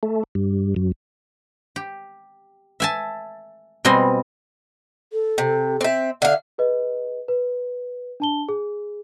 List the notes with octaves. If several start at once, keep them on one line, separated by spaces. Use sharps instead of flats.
A3
G2
F#2
G4
E5 G#5 A5
B2 G3 C4 D#5 G#5
A4
C3
C4 E5
D3 E5 F5
G#4 B4 D#5
B4
D4 A5 G7
G#4